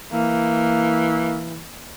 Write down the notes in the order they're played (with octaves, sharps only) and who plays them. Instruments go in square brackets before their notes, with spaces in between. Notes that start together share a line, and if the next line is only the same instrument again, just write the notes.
[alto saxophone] E3 [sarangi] A#3